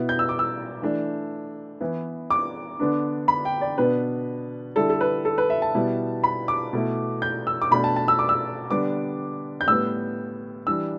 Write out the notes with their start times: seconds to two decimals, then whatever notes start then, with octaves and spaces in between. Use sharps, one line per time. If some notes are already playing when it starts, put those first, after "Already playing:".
Already playing: B2 B3 E4
0.09 G6
0.19 E6
0.29 D6
0.39 E6
0.82 E3 A3 D4
1.81 E3 B3 E4
2.30 D6
2.80 D3 B3 D4
3.28 B5
3.45 G5
3.61 D5
3.78 B2 B3 D4 B4
4.76 D3 G3 E4 A4
4.90 A4
5.01 B4
5.25 A4
5.38 B4
5.50 E5
5.62 A5
5.75 B2 G3 B3 E4
6.24 B5
6.48 D6
6.73 B2 A3 E4
7.22 G6
7.47 E6
7.62 D6
7.71 B2 A3 D4 B5
7.84 A5
7.96 A5
8.08 E6
8.19 D6
8.29 E6
8.70 D3 G3 B3 D4 D6
9.61 G6
9.68 A2 G3 B3 E6
10.67 E3 G3 D4 E6